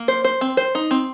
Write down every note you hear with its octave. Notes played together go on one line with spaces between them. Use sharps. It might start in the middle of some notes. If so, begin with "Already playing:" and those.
Already playing: A#3
C5
C5
C4
C5
D#4
C4